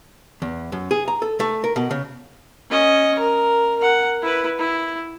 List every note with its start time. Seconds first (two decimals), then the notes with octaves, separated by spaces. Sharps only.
0.42 E2
0.72 F#2
0.91 G#4
1.08 A#5
1.22 A4
1.40 A3
1.64 A#4
1.76 B2
1.91 C#3
2.70 C#4 D#5
3.19 A#4
3.79 A#4 F#5
4.22 E4 B4
4.58 E4